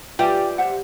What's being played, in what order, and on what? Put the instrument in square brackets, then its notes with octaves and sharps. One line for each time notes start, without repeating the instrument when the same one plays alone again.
[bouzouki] G3 [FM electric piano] F4 B4 E5 [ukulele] G5 G#5
[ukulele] C5 E5 F#5